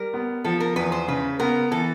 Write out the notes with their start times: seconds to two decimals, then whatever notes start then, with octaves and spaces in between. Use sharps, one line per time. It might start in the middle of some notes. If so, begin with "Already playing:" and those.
Already playing: G3 A#4
0.14 B3
0.44 F3 A4
0.60 A#4
0.76 E2 B4
0.92 C5
1.08 C#3 B4
1.39 B3 A#4
1.71 E3 A4